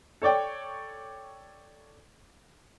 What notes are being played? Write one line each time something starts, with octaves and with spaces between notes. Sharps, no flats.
A4 C#5 D5 G5